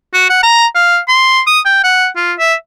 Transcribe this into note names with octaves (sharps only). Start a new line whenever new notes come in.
F#4
F#5
A#5
F5
C6
D#6
G5
F#5
F4
E5